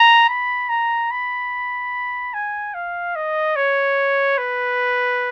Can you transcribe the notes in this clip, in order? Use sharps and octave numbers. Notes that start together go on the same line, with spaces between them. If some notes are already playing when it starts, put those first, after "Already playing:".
Already playing: A#5
B5
A#5
B5
G#5
F5
D#5
C#5
B4